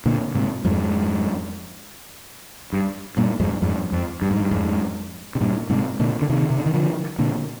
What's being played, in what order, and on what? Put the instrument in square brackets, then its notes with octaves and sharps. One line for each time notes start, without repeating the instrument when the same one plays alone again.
[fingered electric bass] A#2 D3
G#2 C3
F2 G#2
G2
G2 A#2
F2 G#2
F2 G#2
F2
G2
G#2
G2
F2 G#2
C3
G2 A#2
G#2 C3
A#2 D3
D3
C3 D#3
C3
D3
D#3
D3 F3
A#2 D3